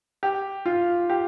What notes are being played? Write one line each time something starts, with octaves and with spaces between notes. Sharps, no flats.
G4
F4
G4